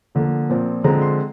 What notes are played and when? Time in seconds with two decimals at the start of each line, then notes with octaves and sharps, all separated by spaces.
0.15 D3 F3 A#3
0.49 A#2 F3 C4
0.84 D3 F3 G#3 C4 A#5
1.02 C6